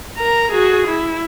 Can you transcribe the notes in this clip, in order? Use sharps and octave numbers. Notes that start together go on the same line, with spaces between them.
A#4 A#5
F#4 G#4
E4